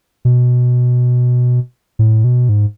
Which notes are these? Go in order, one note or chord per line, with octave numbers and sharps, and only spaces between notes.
B2
A2
B2
G#2